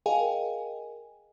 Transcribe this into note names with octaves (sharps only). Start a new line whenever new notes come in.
G#4 A#4 D#5 F5 G5 G#5